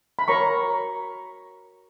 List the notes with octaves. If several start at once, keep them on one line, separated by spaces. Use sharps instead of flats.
B5
F#4 A#4 C#5 A#5 C#6